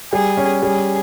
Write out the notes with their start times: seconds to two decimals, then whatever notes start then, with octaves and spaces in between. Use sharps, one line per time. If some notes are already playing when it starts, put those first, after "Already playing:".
0.13 G3 G#4
0.37 C#4
0.62 G3 G#4